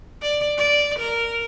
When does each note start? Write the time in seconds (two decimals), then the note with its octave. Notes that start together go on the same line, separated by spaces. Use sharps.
0.22 D5
0.57 D5
0.99 A#4